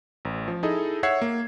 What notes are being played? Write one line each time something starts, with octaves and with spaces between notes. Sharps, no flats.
A1
F3
D#4 E4 G#4 A4 D#5
C#5 E5 F#5 E6 G#6 C7
A#3